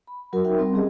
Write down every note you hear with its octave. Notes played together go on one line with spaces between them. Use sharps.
B5
F#3 F#4 A#4
D#4 A#4 E5 G5
G3 C4 C6
C#4 G4 G#4 D#5